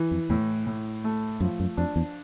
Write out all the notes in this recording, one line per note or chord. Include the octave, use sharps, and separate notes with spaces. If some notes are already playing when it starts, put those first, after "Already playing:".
Already playing: E3
F2
E2 A2
A2
A3
F#2 F3
F#2
F2 D4
E2